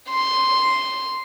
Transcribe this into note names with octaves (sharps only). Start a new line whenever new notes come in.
C6